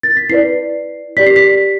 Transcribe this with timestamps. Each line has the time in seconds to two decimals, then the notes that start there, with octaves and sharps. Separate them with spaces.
0.03 A6
0.17 B6
0.30 E4 B4 D5 C7
1.17 G4 D5 B6
1.27 C7
1.36 B6